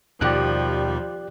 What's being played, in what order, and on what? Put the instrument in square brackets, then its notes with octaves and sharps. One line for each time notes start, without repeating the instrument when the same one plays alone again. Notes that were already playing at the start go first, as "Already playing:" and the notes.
[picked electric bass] D#2 B2 D#3 [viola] F3 [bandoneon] G3 [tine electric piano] G4 D5 F#6